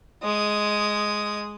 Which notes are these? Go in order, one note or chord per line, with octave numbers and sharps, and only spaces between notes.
G#3 D#6